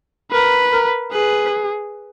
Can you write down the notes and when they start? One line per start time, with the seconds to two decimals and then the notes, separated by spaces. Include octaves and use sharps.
0.32 A#4 B4
0.72 A#4
1.12 G#4 B4